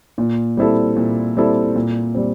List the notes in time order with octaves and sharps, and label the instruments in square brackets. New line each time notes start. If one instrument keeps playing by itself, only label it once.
[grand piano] A#2
G3 C4 E4 A4
A#2
G3 C4 E4 A4
A#2
G3 C4